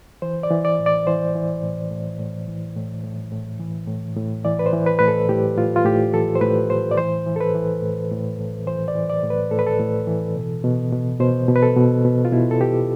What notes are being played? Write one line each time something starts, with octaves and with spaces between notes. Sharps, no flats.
E3 C5
D5
E3
D5
A2
D5
E3 C5
E3
A2
A2
A2
E3
A2
A2
A2
E3
A2
A2
E3 D5
B4
C5
E3
B4
A2 B4
A4
A2 G4
A2 F4
F4
A2 G4
E3 A4
C5
A2 B4
A2 C5
D5
E3 C5
E3
A4
B4
E3
A2
A2
A2
E3 C5
D5
E3
D5
A2
B4
A2 A4
B4
A4
A2
E3
B2
B2
B2
B2 C5
B2
B4
A4
B2
B2
F4
B2 E4
A4
B2 G4